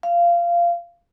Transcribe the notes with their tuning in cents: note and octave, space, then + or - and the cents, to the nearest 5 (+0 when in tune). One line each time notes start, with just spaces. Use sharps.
F5 -20